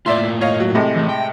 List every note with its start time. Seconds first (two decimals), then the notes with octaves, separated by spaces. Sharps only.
0.06 A2 A#3 F4 D5 E5 C6
0.41 C#5 D#5 F5
0.60 F#3
0.75 A2 C3 G#3
0.96 E3 A3
1.09 G5